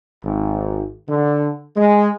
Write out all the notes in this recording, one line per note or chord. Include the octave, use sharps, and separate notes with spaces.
G#1
D3
G#3